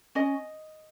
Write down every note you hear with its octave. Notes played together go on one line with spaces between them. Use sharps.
C#4 D#5